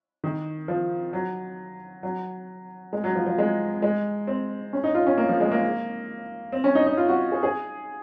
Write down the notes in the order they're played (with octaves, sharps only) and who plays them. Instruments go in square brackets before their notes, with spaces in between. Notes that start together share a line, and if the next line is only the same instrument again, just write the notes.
[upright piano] D#3
F3
F#3
F#3
G#3
F#3
F3
F3
G#3
G#3
C4
C#4
D#4
F4
C#4
A#3
F3
G#3
A#3
C4
C#4
D#4
D#4
F4
F#4
G#4
G#4